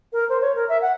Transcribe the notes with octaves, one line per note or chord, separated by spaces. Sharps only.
A#4
C5
C#5
A#4
E5
F#5